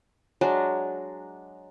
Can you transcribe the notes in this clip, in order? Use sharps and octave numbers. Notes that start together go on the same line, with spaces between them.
F#3 G#3 D4